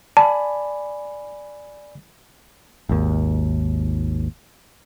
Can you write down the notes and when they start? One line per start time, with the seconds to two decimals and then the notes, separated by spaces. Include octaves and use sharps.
0.17 D5 G#5 A5 B5
2.89 G#1 D#2